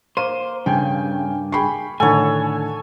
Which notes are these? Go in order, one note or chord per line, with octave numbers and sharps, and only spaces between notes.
A#3 C5 D#7
G2 C#3 G5 G#5
G#4 G5 B5 C#6 C7
A2 D3 D#3 A4 C#5 F#5 G#5 B5